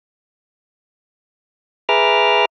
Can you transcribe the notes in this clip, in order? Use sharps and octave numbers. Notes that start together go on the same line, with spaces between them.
G#4 B4 E5 A#5 D6 F6